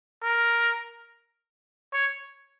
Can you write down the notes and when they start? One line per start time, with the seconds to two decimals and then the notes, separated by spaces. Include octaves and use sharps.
0.22 A#4
1.93 C#5